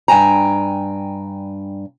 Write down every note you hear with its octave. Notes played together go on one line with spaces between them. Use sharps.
G2 G5 G#5 A#5